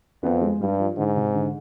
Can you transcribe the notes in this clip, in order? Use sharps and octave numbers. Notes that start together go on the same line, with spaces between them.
F2 B3
G#3
G2 G3
F3
G#2 D3
C3
D3